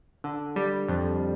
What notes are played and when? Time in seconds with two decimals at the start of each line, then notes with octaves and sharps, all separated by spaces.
0.24 D3
0.56 G3
0.88 F2